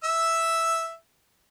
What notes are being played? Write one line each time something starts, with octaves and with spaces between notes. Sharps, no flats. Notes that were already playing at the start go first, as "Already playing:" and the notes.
E5 E6